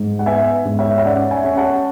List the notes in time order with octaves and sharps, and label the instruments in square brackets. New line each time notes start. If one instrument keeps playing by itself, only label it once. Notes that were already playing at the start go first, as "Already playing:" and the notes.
Already playing: [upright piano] G#2
F#5
B3 E5 G#5
G#2
C#5 E5
E5
C#4 D5 F#5
E5 G#5
C#4
F#5 A5